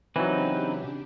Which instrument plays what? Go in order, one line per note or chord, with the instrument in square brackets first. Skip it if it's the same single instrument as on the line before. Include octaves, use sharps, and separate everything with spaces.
[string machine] C#3 D4 G4 [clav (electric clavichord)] E3 F#3 [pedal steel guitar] C4 D#4 B4